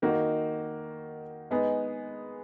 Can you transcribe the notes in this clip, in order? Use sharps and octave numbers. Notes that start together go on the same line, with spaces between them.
D#3 A#3 D#4 F#4
G#3 B3 D#4 G#4